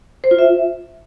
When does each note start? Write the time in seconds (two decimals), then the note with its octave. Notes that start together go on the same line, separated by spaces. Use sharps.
0.24 C5
0.31 F4
0.39 E5